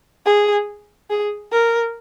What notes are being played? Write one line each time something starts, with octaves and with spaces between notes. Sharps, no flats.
G#4
G#4
A#4